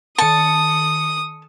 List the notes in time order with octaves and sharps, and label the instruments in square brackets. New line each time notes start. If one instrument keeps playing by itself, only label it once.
[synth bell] D#3 C#7 [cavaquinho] A5 [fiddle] D#6